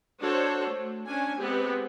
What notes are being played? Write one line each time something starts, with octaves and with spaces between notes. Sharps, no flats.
D4 F#4 A4 C5 C#5
A3
C#4 D4 G#5
G#3 B3 C4 G4